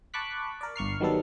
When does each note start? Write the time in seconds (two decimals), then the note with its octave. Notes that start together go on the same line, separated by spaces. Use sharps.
0.14 A5 B5 C#6 D6 F#6 B6
0.61 A#4 D5
0.76 G1 C#6 F6 C7
1.00 D#3 F#3 G3 B3 A4